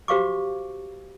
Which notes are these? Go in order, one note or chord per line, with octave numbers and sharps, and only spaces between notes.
F#4 G4 C5 F5 C#6 D6